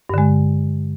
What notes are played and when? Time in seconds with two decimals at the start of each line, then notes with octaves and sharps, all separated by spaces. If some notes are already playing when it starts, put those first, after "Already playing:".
0.10 G2
0.14 D3
0.18 G#3